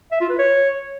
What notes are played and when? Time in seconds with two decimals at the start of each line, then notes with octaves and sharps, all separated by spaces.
0.12 E5
0.21 F4
0.30 B4
0.38 C#5